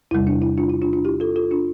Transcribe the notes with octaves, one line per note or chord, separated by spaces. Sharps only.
E2 C3 G3 E4
D4
E4
D4 F4
E4
D4 F4
D4 F4
E4 G4
F4 A4
F4 A4
D4 F4